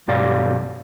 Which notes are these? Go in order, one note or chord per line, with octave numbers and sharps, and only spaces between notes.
B1 G2 G4 D5 F5